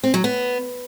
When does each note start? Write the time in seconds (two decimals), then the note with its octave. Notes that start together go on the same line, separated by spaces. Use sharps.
0.04 C4
0.14 F#3
0.24 B3